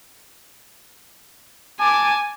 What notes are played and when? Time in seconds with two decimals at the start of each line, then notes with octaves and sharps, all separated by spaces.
1.80 G#5 A5 D6